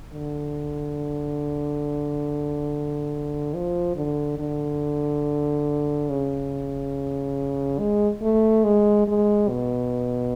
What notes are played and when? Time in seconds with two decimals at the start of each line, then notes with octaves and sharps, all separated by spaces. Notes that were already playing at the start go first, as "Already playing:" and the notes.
0.13 D3
3.54 F3
3.96 D3
4.39 D3
6.10 C#3
7.79 G#3
8.22 A3
8.64 G#3
9.08 G#3
9.49 B2